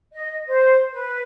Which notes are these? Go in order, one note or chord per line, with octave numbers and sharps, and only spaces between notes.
D#5
C5
B4